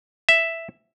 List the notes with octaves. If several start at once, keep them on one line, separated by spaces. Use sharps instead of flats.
E5